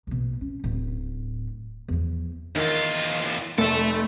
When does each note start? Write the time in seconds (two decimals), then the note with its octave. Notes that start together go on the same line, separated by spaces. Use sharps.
0.07 A#1 B2
0.41 C#4
0.64 D1 A2
1.88 E2 F3
2.56 E2 D#3 F4
3.58 F1 A3 A4 E5